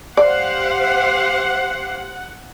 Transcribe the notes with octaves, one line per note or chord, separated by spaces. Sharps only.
G4 C5 D5 F5 F#5